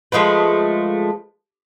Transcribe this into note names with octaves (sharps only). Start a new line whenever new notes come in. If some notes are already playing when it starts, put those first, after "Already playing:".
F3 G#3 A3 B4